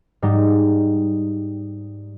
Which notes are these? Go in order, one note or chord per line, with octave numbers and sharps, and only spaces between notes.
G#2 G3 D#4